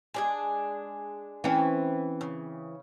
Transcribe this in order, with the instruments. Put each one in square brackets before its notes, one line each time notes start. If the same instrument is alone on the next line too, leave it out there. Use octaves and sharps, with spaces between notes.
[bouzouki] G#3 D4 G#4
[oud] E3 C4 C#4
[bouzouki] C#3